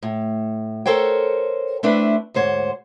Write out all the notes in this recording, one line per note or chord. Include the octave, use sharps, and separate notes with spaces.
A2
A4 A#4 C5 C#5 G5
A3 C4 D4 E4 B4
D2 G#2 C5 C#5